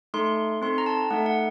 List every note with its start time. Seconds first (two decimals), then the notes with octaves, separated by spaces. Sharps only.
0.14 A3 D#4 A4 C6
0.62 C4 D#4 A4 C6
0.78 A#5
0.86 A5
1.10 A3 D#4 A4 F#5
1.26 F#5